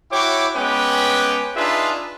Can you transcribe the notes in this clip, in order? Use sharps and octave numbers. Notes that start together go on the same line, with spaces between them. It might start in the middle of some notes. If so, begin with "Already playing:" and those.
E4 F#4 C#5 G5 D6
G#3 B3 C#4 B4 G5 D6
D4 D#4 F4 G#4 B4 E5